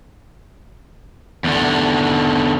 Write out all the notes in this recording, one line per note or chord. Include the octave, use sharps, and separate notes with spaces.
E2 D3